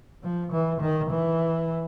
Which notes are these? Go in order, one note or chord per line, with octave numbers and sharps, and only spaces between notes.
F3
E3
D#3
E3